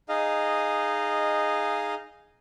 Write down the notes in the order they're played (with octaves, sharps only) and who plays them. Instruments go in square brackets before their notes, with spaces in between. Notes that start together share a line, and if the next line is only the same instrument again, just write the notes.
[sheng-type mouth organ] D#4 G#4 D#5 F5